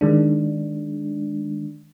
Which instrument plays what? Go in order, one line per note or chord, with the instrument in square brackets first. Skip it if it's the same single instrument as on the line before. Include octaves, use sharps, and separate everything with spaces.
[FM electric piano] D#3 G#3 D4